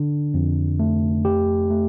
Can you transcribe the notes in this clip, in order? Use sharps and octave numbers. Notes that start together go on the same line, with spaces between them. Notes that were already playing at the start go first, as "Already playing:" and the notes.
Already playing: D3 D4
F2
A3
G4
A3